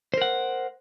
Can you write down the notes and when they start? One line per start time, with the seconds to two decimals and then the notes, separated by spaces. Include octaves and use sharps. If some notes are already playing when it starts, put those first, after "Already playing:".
0.14 C5
0.18 A#4
0.22 F#5